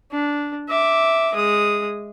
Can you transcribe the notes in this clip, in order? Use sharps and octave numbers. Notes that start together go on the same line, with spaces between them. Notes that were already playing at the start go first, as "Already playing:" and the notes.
D4
E5 D6
G#3 D#6